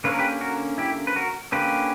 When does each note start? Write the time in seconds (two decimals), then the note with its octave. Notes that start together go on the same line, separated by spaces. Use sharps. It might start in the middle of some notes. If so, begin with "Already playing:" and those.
0.04 D3 A#3 C#4 B4
0.12 A#4
0.19 G4 B4
0.41 F#4 A#4
0.78 E4 G4
1.07 B4
1.16 F#4 A#4
1.52 D3 A#3 C#4 G4 B4